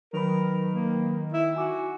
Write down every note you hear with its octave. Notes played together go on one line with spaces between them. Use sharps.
D#3 F#3 A#4 B4 B5
A#3
E4
F#4 G#5 D6